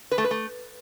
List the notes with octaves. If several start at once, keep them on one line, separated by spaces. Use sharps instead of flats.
B4
A3
B4
A3